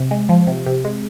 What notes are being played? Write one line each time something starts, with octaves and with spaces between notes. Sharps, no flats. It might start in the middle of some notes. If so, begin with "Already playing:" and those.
Already playing: C3
G#3
F3
C3
C3
G#3